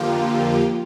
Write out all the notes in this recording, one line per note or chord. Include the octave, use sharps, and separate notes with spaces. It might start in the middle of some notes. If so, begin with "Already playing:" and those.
Already playing: F2 D3 F3 A#3 F4 G4